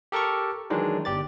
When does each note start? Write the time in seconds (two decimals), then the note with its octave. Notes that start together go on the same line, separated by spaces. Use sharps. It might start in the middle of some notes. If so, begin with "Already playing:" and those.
0.12 G4 A4 A#4 A5 C#6
0.70 D#3 E3 F#3 G#3 D4 D#4
1.05 G1 G4 D5 A6